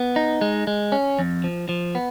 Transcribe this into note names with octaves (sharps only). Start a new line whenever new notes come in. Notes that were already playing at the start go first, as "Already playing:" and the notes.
Already playing: B3
D#4
G#3
G#3
C#4
F2
F3
F3
B3